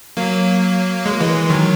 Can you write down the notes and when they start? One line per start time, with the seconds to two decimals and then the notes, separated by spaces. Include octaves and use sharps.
0.17 F#3 A#3
1.06 G#3
1.13 A#3
1.20 E3 G#3
1.49 D#3 F#3